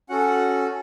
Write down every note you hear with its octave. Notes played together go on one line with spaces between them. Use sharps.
C#4 F#4 A4 F#5